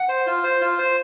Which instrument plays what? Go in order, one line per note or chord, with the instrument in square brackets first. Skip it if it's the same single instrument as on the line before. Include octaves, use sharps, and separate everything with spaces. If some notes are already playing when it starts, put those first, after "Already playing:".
Already playing: [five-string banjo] F#5
[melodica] C5
F4
C5
F4
C5